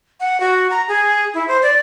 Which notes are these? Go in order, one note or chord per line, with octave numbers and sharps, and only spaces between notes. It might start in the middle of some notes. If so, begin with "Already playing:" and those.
F#5
F#4
A#5
G#4
E4
C5
D5